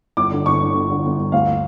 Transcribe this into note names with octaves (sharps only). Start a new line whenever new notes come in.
G1 D6
D3
G1 C#6
D3
G1
D3
G1
G1
D2 F5